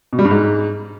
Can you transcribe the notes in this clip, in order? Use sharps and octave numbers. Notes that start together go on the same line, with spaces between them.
B2
G3
G2
G#2